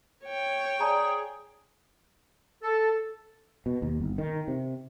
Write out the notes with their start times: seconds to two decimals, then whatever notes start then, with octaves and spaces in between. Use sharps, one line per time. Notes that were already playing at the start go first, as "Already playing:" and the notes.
0.24 C#5 G5
0.80 G#4 D5 A5 A#5
2.62 A4
3.66 B2
3.82 D#2
4.00 G1
4.18 D#3
4.48 C3